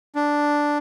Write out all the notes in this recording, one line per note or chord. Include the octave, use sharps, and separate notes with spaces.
D4